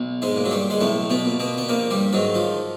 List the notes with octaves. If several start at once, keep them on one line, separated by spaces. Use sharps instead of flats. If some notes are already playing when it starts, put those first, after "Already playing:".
Already playing: B1
G#2 G#3
A#2
F#3
G2 G3
G#3
B1 A2 A3
B2 B3
A#2
B2 B3
B3
A#1 A#2 A#3
G2 G3
G#2 D#3 F#3
F3